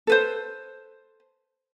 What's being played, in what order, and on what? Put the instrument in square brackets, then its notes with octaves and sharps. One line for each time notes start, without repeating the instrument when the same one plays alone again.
[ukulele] A4 B4 C5